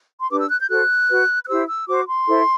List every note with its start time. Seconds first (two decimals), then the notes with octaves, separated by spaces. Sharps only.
0.20 C6
0.30 D4 G4 B4 D6
0.39 E6
0.49 F#6
0.59 G6
0.69 F#4 A4 C5 F#6
1.09 F#4 B4
1.43 F#6
1.48 E4 G4 C5 E6
1.68 E6
1.87 F#4 C5 D6
2.07 C6
2.27 E4 A4 C5